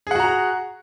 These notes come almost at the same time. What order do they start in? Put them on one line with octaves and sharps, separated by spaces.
G#4 F#5 F#4 A#5